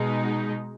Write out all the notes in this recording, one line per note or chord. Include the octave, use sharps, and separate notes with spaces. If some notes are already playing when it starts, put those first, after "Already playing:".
Already playing: B2 G#3 D#4